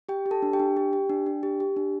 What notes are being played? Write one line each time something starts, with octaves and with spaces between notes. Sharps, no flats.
G4 G5
G4
A4 A5
D4
G4 G5
D4
G4
G4
D4
D4
G4
G4
D4